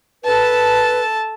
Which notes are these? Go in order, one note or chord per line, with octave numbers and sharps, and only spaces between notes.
A4 B4 A5